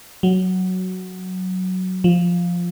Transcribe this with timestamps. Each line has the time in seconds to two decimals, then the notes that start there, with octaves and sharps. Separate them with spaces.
0.23 F#3
2.04 F3